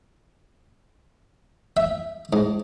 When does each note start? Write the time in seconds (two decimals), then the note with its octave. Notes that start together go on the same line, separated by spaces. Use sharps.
1.77 E5
2.33 G#2